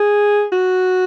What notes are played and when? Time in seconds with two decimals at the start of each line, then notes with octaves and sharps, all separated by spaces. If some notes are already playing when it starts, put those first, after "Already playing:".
Already playing: G#4
0.52 F#4